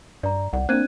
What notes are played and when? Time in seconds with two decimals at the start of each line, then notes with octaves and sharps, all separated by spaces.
0.23 G2 D5 A#5
0.53 C2 D5 F#5
0.69 A#3 C4 D4 F#6 G#6 D#7